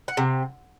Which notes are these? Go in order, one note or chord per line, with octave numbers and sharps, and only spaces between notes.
F#5
C3